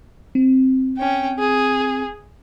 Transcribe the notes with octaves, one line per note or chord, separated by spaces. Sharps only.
C4
C#4 G5
G#4